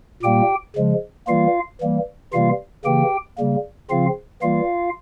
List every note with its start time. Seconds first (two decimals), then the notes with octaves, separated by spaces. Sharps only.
0.23 A#2 G3 A#3 G4 G5
0.76 C#3 F3 G#3
1.27 E3 G3 A#3 F4 F5
1.81 E3 G3 A#3
2.33 C3 E3 G3 A#3 F4 F5
2.85 C#3 E3 A#3 G4 G5
3.38 C#3 G3 A#3
3.90 C#3 F3 C4 F4 F5
4.42 E3 G3 A#3 F4 F5